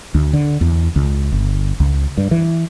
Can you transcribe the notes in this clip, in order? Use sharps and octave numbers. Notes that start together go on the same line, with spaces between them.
D2
D3
E2
C#2
G1
C#2
G2
E3